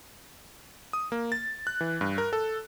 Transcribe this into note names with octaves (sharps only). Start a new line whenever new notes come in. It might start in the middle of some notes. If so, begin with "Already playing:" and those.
D#6
A#3
A6
F#6
E3
G2
A#4
A4